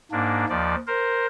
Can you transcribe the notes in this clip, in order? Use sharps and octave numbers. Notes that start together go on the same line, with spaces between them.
G#2 A#3 D4
D#2 F3 D5
A#4 C5